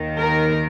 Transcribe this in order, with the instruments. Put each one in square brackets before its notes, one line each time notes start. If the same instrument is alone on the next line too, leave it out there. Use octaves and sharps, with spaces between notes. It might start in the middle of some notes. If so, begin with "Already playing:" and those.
Already playing: [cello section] D#2 D#3
A#4